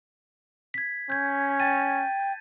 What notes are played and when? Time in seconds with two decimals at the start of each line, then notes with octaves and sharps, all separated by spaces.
0.74 G#6 B6
1.10 C#4 G6 G#6
1.60 G5 A5 A6 D#7